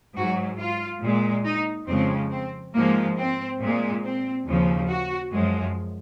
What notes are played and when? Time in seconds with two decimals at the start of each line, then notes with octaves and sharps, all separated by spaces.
0.15 G#2 F#3 F#4
0.58 F4
1.01 A#2 G#3
1.45 D#4
1.87 F2 C#3 F3 G#3 C4
2.31 C4
2.74 G#2 F3 G#3 A#3
3.17 C4
3.60 A#2 G#3
4.04 C4
4.47 D#2 C#3 F3
4.89 F#4
5.32 F#2 F3 G#3